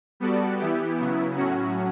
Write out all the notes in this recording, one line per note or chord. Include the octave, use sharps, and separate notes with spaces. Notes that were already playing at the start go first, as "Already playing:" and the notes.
G3 B3 F#4 A4 D5
E3 B3 E4 G4
C#3 F#3 B3 E4
A2 F#3 C#4 F#4